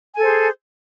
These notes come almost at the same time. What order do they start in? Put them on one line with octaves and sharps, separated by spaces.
G#5 A4 C5 G#4